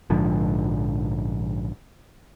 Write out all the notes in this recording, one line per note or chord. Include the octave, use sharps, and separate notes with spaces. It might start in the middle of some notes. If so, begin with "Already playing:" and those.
A#1 G#2 D3 F3